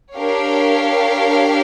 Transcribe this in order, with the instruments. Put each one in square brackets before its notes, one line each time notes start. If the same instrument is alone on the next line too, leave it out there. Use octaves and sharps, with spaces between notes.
[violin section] D4 G4 A#4 C#5 F5